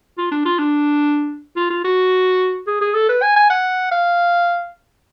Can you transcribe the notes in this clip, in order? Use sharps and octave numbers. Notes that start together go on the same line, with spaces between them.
F4
D4
F4
D4
F4
F4
F#4
G#4
G#4
A4
B4
G#5
G#5
F#5
F5